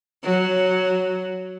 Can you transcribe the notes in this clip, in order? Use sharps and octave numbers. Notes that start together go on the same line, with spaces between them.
F#3